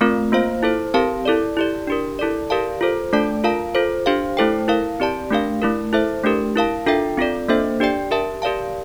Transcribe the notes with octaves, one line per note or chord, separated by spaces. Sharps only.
A3 C4 F4 A#4
A#3 F4 C5 F5
E4 A4 C5
C4 G4 A#4 F5 A5
E4 A4 D5
E4 G4 D5
D4 G4 A#4
E4 A4 D5
G4 A#4 D5 F5 A5
F4 A4 C5
A3 D4 A4 D5 A5
F4 A#4 F5 A5
F4 A4 C5
D4 G4 C5 F5
A3 E4 A4 C5 G5
E4 A#4 F5
C4 G4 D5 A5
A3 D4 G4 A#4 F5
A3 E4 A#4
E4 A4 C5 E5
A3 D4 G4 A#4
E4 A#4 F5 A5
D4 F4 A4 E5 G5
C4 F4 A4 D5
A#3 D4 A4 C5 E5
D4 G4 D5 G5
G4 A#4 E5 A5
G4 A#4 D5 F5 A5